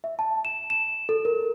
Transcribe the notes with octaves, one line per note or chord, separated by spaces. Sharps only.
E5
A5
E7
E7
A4
A#4